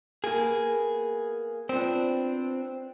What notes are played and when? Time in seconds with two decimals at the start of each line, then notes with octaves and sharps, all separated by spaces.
0.24 A#3 B3 G#4
1.69 F3 B3 C4 D4